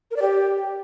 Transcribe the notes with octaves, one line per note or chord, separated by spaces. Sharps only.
A#4
D5
G4